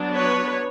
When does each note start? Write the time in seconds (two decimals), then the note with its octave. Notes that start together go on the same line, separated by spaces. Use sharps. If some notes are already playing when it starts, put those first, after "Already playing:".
Already playing: F#3 B3 D4
0.14 B4 C#5